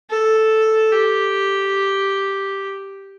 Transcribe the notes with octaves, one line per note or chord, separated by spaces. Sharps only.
A4
G4